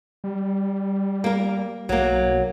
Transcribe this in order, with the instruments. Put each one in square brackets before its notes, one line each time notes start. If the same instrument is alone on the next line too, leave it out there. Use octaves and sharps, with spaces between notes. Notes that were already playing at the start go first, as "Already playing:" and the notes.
[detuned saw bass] G3
[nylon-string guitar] A#3 A#4
[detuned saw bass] B1 [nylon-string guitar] F#3 A#3